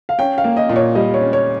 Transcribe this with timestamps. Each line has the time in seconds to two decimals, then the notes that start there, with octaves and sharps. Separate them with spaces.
0.09 F5
0.19 C#4 G5
0.38 F5
0.44 A#3
0.57 D#5
0.69 A#2
0.76 C#5
0.95 G3 D#5
1.14 C#5
1.21 C#4
1.33 C#5